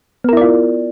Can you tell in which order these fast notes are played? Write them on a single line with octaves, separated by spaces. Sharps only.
B3 A#4 E4 D5 F4